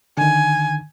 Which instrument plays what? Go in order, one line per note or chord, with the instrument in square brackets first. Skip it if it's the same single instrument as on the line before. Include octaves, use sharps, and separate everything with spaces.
[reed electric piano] D3 D#3 [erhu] G#5